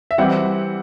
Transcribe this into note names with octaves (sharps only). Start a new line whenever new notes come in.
E5
E3 G3 C4 E4 G4 F#5